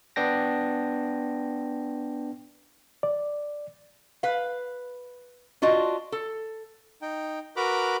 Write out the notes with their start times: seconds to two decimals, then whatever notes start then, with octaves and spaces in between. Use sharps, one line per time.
0.16 B3 D4 G5 A#6
3.03 D5
4.23 B4 F5
5.62 D4 F4 F#4 D#5
6.12 A4
7.02 D#4 G5
7.56 F#4 A#4 B4 A#5 B5 D6